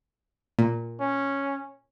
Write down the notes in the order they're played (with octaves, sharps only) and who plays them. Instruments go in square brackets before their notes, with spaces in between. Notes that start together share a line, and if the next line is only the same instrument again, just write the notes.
[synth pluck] A#2
[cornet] C#4